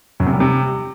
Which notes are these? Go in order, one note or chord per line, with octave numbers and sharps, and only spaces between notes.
F#2
C3
G3
C3